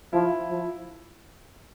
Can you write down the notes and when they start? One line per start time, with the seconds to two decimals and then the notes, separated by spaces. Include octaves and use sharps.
0.13 F3 E4
0.51 F3